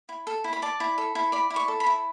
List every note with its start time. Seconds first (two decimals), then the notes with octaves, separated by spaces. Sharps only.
0.09 E4
0.27 A4
0.44 E4
0.53 B5
0.62 D5 A5
0.80 E4
0.98 A4
1.15 E4
1.32 D5 B5
1.50 E4
1.56 C#6
1.68 A4
1.80 B5
1.86 E4